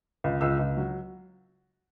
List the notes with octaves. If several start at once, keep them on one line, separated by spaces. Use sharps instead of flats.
C#2
C#2 E6
C#2
F#3